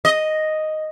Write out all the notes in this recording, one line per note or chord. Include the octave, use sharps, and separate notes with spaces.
D#5